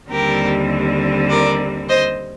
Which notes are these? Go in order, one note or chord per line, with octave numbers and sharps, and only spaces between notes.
D#2 D3 G3 C4 G4 A#4
A#4 D5
C5 D#5